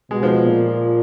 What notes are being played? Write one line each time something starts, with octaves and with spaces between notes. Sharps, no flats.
B2 G#3
F3
A#2